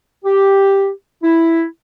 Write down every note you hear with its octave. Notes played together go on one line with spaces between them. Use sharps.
G4
E4